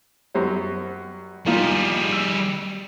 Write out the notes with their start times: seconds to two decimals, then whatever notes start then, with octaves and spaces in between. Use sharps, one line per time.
0.34 F#2 G3 C5
1.46 G#1 G3 A#3 F4 G#4
2.12 E6